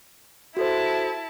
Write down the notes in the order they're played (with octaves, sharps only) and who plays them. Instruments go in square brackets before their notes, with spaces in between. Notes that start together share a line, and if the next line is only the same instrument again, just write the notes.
[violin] E4 A5 [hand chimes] F#4 A4 C5